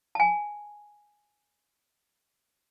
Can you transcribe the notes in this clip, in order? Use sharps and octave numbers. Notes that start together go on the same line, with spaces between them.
G#5 A5